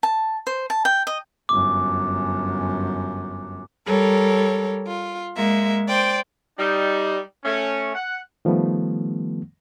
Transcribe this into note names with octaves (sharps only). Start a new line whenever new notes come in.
A5
C5
A5
G5
D#5
G1 F#2 D6
G3 A4 A#4 C#5
F4
G#3 A#3 E5
C5 D5 G5
G3 D#4
A3 C#4
F#5
D#3 F3 G3 A3 B3